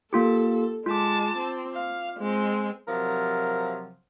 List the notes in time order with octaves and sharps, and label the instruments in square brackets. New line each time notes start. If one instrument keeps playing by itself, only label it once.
[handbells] A#3 F4 G4 [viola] A4
[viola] G#3 A5 [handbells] F4 D6
[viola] C4
F5
G#3 C4
[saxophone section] C3 F3 F#3 A#4